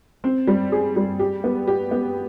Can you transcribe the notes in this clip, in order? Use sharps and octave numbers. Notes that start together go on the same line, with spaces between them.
C4
G3
G#4
G3
G4
B3
G4
B3